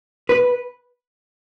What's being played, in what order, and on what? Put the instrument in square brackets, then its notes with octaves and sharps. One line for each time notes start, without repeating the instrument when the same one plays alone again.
[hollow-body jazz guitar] B4